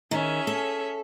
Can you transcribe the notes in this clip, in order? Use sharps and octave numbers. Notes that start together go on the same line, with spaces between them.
D#3 C#4 G#4 E5
A4